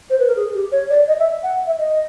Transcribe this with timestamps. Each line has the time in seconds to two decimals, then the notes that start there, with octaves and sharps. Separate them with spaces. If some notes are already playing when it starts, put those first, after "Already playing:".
0.10 C5
0.19 B4
0.28 A#4
0.36 G#4
0.55 G4
0.72 C#5
0.90 D5
1.08 D#5
1.19 E5
1.43 F#5
1.67 E5
1.78 D#5